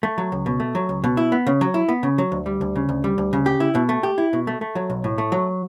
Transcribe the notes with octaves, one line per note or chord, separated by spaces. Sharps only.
A3
F#3
C#2
B2
A3
F#3
C#2
B2
E4
B3
C#3
F#3
E4
B3
C#3
F#3
D2
G3
D2
C#3
D2
G3
D2
C#3
G4
E4
B2
A3
G4
E4
B2
A3
A3
F#3
B1
A2
A3
F#3